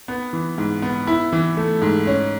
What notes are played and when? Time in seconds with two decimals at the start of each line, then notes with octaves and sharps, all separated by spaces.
0.08 B3
0.33 E3
0.58 G#2
0.82 B3
1.07 E4
1.32 E3
1.57 A3
1.82 G#2
2.07 C#4